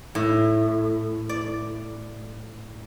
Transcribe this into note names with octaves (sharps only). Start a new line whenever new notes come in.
A2
D5